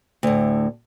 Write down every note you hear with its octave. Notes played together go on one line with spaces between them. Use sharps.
D2 A2